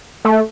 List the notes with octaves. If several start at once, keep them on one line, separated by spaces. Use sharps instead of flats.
A3